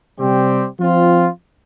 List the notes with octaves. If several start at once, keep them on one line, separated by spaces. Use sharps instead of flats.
C3 G3 C4 G4
F3 C4 F4